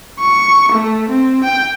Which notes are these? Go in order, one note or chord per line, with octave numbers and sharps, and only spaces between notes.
C#6
A3
C4
G5